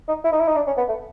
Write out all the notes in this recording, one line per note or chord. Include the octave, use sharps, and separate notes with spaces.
D#4
E4
D#4
E4
D#4
D4
C#4
B3
A3